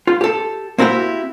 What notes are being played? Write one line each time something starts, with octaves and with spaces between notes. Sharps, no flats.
F4
G4 A4
A#3 C4 E4 F#4 G4